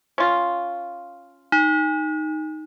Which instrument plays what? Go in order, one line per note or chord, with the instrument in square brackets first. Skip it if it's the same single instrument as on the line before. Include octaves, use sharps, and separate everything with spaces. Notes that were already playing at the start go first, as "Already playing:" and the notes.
[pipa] C#4 F4
[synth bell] D#4